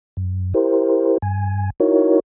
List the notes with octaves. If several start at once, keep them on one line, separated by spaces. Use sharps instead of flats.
F#2
E4 G4 A#4 C5
G2 G#5
D#4 E4 F#4 A#4 C#5